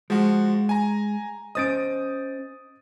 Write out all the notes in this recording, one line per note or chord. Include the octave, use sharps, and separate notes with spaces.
F3 G#3 F#4
G#5 A#5
C#4 C5 D#5 D#6 A6 D7